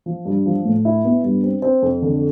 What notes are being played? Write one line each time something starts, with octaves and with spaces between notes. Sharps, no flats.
F3
G2
F3
A2
E4
B3
G2
C4
C4
F2
D3